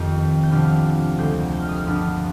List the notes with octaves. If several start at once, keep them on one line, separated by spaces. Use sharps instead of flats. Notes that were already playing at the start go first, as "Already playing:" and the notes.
Already playing: F2 D#3 G3 C4 G6
G6
C2 C3 F3 B3 D4 F6
D2 D3 G#3 C4 G6
G6
F6
D#6
F6
G2 F3 B3 D4